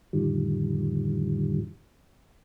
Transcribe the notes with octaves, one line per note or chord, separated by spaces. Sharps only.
F2 A2 D3 D#3 F3 G3